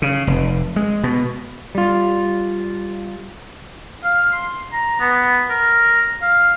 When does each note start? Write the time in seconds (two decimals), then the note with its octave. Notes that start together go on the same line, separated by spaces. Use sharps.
0.02 C#3
0.27 F1
0.76 G#3
1.03 B2
1.75 G3 F4
4.04 F5
4.32 C6
4.73 A#5
5.00 B3
5.50 A#4
6.22 F5